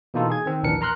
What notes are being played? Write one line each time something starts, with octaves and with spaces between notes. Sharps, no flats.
B2 E3 A#3 D#4 F4 A4
G#4 G#6
D#3 C4
A#1 D#2 E3 D4 A#4 C#7
A#4 A#5 C6 F6 F#6